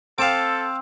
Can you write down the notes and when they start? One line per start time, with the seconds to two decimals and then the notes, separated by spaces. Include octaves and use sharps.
0.18 C4 A4 F5 A5 D6